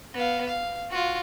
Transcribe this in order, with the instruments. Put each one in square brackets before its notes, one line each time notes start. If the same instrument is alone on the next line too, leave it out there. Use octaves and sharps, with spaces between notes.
[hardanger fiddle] B3 F5
F5
F4 F#4